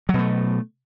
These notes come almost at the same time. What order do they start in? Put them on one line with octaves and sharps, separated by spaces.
F#3 B2 A3